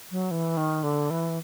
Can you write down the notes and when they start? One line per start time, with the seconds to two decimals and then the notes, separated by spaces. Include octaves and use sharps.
0.11 F#3
0.31 E3
0.57 D#3
0.83 D3
1.10 E3